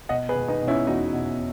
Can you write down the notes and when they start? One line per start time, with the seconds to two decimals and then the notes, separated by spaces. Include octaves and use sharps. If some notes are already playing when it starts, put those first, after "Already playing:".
0.09 B2 D#5 F#5
0.29 G#4 B4
0.35 B2
0.48 B3 D#4
0.62 B2
0.67 C#4 E4
0.87 E2 D#4 F#4
1.13 B2